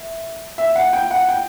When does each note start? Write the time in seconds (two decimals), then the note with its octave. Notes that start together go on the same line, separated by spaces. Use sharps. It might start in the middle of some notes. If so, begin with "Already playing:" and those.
Already playing: E5
0.58 E5
0.76 F#5
0.93 G5
1.11 F#5
1.29 G5